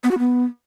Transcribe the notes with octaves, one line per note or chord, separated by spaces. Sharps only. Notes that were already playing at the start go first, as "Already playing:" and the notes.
B3
F#4
B3